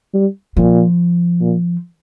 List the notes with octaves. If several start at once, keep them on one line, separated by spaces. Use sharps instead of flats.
G3
A#2 F3
A#2